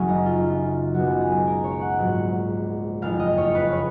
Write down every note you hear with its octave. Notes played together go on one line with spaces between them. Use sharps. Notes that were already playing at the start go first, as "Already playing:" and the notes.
Already playing: F#1 F#2 C#3 F#3 C#4
D#4
F4
C#2 B2 F#3 F#4
G#4
A#4
C#5
F#5
A#1 G#2 F#3
F#1 F2 C#3 F5
D#5
C#5
B4
C#5